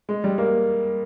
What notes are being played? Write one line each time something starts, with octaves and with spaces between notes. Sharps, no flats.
G#3
G3
A#3